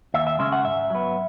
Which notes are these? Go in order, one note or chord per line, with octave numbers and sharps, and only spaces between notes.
D#2 E5
E5
C#3 G#3 C#4 E5
F#5
G#2 E5
F#3 B3